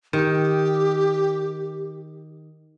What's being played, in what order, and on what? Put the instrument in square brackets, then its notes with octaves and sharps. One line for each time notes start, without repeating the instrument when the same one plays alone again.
[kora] D#3 [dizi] G4